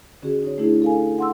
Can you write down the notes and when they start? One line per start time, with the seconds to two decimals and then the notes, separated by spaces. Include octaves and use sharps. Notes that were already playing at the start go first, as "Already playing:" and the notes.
0.23 D3 C#4 F#4 G#4
0.43 D#4 C#5
0.58 A3 D4 E4 G#4
0.82 A4 F5 G#5
1.18 F#5 C6 E6